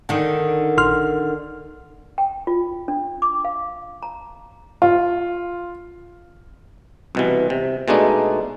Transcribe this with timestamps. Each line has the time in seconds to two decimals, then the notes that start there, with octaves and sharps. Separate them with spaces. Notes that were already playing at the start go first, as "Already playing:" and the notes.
0.09 D3 D#3
0.77 A#1 C6 F6
2.18 G5
2.47 F4
2.88 D4
3.22 D6
3.45 F5
4.03 A#5
4.82 F4
7.15 C2 B2 E3
7.50 C3
7.88 B2 G#3 A3 D4 D#4